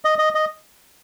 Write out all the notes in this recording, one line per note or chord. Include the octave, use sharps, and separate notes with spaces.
D#5
D#5
D#5